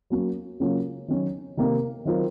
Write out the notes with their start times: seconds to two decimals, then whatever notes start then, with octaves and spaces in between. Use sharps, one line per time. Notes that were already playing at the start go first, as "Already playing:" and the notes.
0.10 F#3 A#3 C#4 F#4
0.60 C#3 F#3 A#3 C#4 F4
1.08 D#3 F#3 C#4
1.57 C3 D#3 A#3 D#4 A#4
2.05 D#3 F#3 C4 F4 A#4